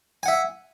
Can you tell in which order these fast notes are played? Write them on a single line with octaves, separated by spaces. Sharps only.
G#5 F#5 E5